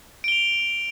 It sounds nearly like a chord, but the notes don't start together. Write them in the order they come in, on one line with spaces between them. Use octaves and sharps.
D7 G7 F7